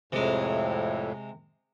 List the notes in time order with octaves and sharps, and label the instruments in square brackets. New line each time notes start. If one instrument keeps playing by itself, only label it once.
[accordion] F2 A2 [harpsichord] C3 G#3